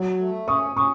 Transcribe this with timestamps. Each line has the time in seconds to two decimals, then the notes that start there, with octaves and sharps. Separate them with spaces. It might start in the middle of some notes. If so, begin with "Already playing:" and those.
Already playing: F#3
0.19 A3
0.48 C#4 C#6 D#6
0.76 C#4 C#6 D#6